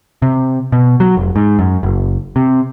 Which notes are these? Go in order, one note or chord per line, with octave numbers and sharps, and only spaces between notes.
C3
B2
F#3
F1
G#2
F#2
F#1
C3